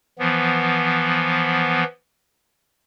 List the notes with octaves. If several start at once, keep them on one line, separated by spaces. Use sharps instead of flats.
E3 F3 B3